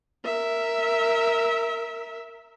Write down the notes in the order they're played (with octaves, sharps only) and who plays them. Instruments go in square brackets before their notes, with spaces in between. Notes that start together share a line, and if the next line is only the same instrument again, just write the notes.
[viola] A#4 E5